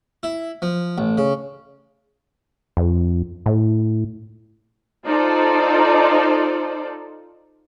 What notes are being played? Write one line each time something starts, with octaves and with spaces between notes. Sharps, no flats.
E4
F3
A1
C#3
F2
A2
D#4 F4 A4 C5 D5